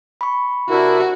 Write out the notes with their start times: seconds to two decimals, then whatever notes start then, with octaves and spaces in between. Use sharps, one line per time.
0.21 B5 C#6
0.69 C3 D4 E4 F#4 A#4